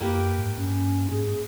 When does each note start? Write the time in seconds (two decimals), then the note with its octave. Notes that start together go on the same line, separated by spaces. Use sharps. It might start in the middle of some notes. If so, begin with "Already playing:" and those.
0.01 F#2 A#3 G4 B4
0.38 G#2
0.57 G2 C#4
1.11 G#2 G#4